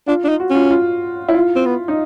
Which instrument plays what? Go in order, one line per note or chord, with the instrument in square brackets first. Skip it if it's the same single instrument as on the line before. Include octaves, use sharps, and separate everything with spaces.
[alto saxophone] D4 [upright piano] F4
[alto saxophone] D4
D#4
[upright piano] F#4
[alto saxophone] C#4
[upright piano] F4
F4
E4
F4
[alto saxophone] C4
B3
[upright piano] D#4